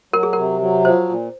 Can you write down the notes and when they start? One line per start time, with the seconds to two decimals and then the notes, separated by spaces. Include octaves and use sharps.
0.13 F#3 A#4
0.23 G#4
0.33 C3 A#4
0.61 F#3
0.85 F3 C5
1.09 A#2